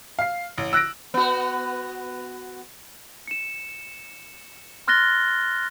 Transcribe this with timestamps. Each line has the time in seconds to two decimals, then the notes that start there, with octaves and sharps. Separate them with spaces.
0.19 F5 C7
0.58 A1
0.73 E6 F#6 A#6 D7
1.14 B3 F#4
3.27 C#7 E7
4.88 C6 F6 F#6 A6 A#6 G7